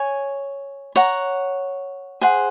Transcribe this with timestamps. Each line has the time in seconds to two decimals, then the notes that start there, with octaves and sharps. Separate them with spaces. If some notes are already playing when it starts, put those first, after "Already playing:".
Already playing: C#5 G#5
0.96 C#5 F#5 A#5
2.21 G#4 C5 F#5